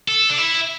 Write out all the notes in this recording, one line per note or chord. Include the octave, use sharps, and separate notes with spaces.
A4
D4
E4